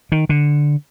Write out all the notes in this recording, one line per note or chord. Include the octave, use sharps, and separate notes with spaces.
D#3
D3